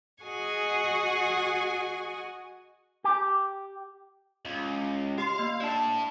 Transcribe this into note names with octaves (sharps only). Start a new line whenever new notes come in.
F#4 G#4 D#5 F#5 G#5 C#6
G4
C#2
G4 F5 C6
A#3 D#5 C7
D4 E4 D5 A5